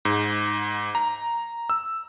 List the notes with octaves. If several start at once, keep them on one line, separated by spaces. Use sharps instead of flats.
G#2
A#5
E6